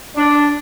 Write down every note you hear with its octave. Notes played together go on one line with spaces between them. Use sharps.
D4